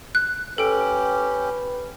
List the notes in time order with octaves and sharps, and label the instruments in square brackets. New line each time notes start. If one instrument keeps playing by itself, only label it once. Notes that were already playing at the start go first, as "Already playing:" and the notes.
[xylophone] F#6
[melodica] C#4 G4 [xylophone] A4 D7 [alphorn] B4